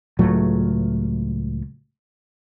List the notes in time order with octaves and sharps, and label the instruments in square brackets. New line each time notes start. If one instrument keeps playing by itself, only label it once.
[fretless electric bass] C#2 A2 F#3 A3